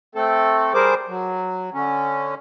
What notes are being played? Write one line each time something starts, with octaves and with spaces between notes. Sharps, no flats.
A3 C4 A4
G3 G#4 A#4 C5 D6
F#3
D3 C#4